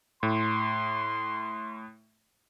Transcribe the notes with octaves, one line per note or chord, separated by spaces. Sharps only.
A2 C6